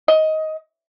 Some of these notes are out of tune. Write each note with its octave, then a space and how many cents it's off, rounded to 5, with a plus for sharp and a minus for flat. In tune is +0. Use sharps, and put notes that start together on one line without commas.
D#5 +15